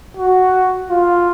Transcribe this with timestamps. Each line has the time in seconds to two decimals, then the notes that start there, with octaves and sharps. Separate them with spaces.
0.17 F#4
0.91 F4